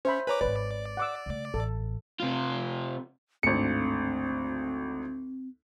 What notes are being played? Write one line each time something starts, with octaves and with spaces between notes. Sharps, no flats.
C#4 C5 E5 B5
B4 C#5 G#5 A#5 D6
D#1 G#1 B4 D5
F#5 D6 E6
C#3 A3
A1 A4
C3 F4
G#1 D2 A2 D3 C4 C#7